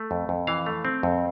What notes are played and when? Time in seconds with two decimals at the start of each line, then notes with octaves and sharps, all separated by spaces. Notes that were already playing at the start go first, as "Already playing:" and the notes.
Already playing: A3
0.11 F2
0.29 F2
0.47 E3 F5
0.66 A3
0.85 C4
1.03 F2